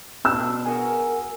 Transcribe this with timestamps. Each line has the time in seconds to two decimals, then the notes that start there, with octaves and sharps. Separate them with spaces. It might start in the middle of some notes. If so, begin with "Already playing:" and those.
0.25 B2 D4 E6
0.66 F#4 G#4 A#4